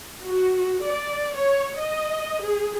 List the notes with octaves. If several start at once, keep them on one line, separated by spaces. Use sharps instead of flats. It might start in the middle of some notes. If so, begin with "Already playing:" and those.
F#4
D5
C#5
D#5
G#4